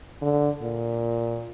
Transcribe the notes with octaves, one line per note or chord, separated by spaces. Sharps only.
D3
A#2